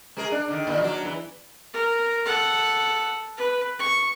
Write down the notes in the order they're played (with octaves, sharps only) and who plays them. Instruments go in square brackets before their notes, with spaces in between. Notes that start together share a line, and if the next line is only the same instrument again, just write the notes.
[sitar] G#3 G#4 A#4
D4
D3 D#3
A#2 D#3 E3
F#3 D4
E2 E3
[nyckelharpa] A#4
A4 F#5
B4
C#6